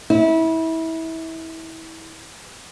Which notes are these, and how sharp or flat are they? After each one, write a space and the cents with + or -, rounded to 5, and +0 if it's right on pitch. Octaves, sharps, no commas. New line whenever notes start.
E4 -25